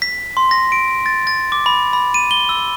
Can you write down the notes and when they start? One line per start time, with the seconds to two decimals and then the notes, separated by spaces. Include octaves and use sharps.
0.02 B6
0.37 C6
0.51 A#6
0.72 D7
1.06 A6
1.27 A6
1.52 D6
1.66 B5
1.93 B5
2.14 D#7
2.31 G7
2.49 E6